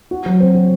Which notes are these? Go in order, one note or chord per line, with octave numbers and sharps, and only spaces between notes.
F#4
F#3
C4
F#3